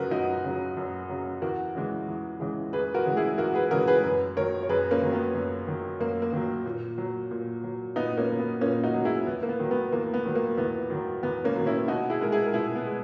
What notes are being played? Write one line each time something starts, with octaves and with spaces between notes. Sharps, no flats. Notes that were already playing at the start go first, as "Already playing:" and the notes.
Already playing: F#2 C#3 F#3 F#4 A#4 B4
F#2 D#4 F#4
C#3 F#3
F#2
C#3 F#3
E2 F#4 A#4
C#3 E3 G#3
E2
C#3 E3 G#3
E2 G#4 B4
F#4 A#4
C#3 E3 G#3
E4 G#4
E2 F#4 A#4
G#4 B4
C#3 E3 G#3 F#4 A#4
G#4 B4
F#2
D#3 F#3 A#4 C#5
C#5
F#2 G#4 B4
A#3 C#4
D#3 F#3
B3
F#2
D#3 F#3
F#2 A#3
A#3
D#3 F#3
A#2
F#3
A#2
F#3
A#2 B3 D#4
A#3 C#4
F#3
B3
A#2 A#3 C#4
D#4 F#4
F#3
E4 G#4
E2 B3
A#3
B3
D#3 F#3
B3
E2 A#3
B3
D#3 F#3
A#3
E2 B3
D#3 F#3
E2 B3
A#3 C#4
D#3 F#3
C#4 E4
B2 D#4 F#4
E4 G#4
G#3 A#4
E4 G#4
A#4
B2 E4 G#4
B3
G#3